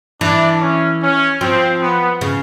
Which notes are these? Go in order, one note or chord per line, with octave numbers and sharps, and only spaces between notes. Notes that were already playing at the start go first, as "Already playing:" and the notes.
E3 D4
C#4
C#4
F3 C4
B3
C#3